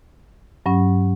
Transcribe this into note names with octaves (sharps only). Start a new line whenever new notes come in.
G2 F#3 C#4